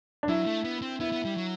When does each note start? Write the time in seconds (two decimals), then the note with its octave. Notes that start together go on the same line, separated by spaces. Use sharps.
0.23 D4
0.28 F#3 E4
0.47 A3
0.64 B3
0.82 C4
1.00 B3 E4
1.12 B3
1.25 G3
1.37 F#3